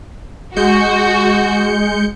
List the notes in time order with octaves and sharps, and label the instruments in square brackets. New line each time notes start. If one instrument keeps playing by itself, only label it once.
[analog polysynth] G#3 G6 C#7 [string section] F#4